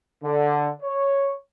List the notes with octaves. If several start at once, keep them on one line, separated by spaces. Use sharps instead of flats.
D3
C#5